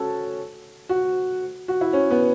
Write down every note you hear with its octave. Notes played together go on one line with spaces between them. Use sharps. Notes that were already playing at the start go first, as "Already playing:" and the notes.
Already playing: C#4 F#4 A4
F#4
F#4
E4
C#4
B3